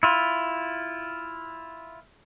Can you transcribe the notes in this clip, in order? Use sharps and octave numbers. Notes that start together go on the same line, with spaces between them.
E4 F4